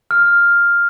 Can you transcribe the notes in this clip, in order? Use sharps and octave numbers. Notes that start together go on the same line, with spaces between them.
F6